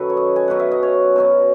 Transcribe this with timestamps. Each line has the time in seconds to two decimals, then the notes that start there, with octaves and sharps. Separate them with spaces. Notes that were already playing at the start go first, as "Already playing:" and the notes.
Already playing: F#2 D#3 F#3 A4 B4
0.10 C#5
0.17 D#5
0.36 G#5
0.48 B2 F#3 C#4 F#5
0.59 E5
0.71 D#5
0.83 C#5
1.16 B2 F#3 C#4